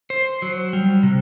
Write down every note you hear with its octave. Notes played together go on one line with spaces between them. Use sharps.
C5
F#3
G3
C3